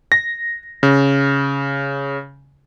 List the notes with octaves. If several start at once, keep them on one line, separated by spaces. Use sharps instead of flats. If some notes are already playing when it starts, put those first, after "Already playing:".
A#6
C#3